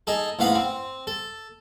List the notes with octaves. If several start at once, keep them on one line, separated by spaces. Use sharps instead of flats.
D#4 G#4 A4
A1 G#2 B3 F5 F#5 B5
C4
A4